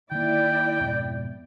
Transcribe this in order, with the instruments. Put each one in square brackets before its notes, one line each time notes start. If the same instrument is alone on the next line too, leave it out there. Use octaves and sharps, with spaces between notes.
[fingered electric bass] D#3 A#3 [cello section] E4 D5 [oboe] G5
[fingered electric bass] F2 G#2 B2